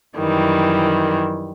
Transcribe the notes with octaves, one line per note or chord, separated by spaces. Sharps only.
F#2 D#3 E3 G3